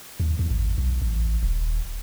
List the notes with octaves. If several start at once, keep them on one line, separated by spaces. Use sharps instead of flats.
D#2
E2
G#1
B1
A1
D#1